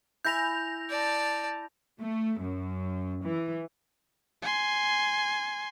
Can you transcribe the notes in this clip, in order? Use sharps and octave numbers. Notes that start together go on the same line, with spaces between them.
E4 G#5 B5 G6 A#6 F7
D5 A5
A3
F#2
E3
G#5 C6